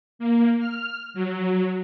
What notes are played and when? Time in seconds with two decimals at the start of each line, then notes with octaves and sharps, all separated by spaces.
0.19 A#3
0.59 F6
1.14 F#3